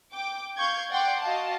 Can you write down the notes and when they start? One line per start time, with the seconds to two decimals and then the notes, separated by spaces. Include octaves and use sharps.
0.13 G5 D6
0.57 F5 C#6 G6 G#6
0.90 D5 F#5 G5 C6 D6
1.22 F#4 D#5 F5 A5